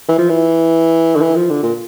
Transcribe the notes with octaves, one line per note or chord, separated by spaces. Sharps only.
E3
F3
E3
D3
E3
F3
D3
A#2